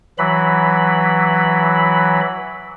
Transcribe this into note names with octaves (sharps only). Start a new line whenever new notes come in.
E3 F#3 B5